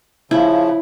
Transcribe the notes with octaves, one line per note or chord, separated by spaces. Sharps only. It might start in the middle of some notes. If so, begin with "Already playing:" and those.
C#3 F3 E4